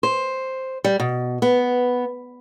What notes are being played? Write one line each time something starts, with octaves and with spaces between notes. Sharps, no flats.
C5
G3
B2
B3